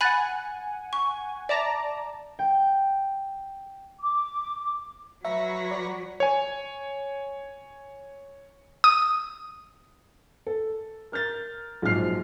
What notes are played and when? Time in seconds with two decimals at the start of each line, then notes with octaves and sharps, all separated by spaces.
0.01 F#5 G#5 B5 F#6 A6
0.93 C#6
1.49 D5 E5 A5 A#5
2.39 G5
4.00 D6
5.25 F#3 B4 C#5 E5 A#5
5.71 D5
6.20 C#5 G#5
8.84 D#6
10.47 A4
11.12 A#4 F6 G6 A6
11.82 A#1 G#2 F3 F#3 F6 C7